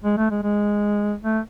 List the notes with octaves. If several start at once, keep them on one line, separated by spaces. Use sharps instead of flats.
G#3
A3
G#3
G#3
A3